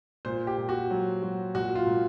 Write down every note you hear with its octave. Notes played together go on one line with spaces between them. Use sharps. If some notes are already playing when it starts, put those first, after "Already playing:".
A#2 C5
G4
A#2
F#4
F#3
F#3
A#2 F#4
F4
A#2